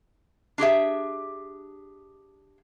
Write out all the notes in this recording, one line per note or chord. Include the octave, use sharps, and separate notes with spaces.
D4 G4 G#4 E5